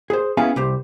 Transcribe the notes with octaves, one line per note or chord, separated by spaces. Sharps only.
G#4 C5
B3 C#4 E4 G#4 F5 G#5
C2 G4 C5